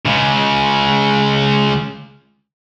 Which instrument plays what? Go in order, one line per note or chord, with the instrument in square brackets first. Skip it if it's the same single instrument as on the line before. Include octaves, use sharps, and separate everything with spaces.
[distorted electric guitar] C#2 C#3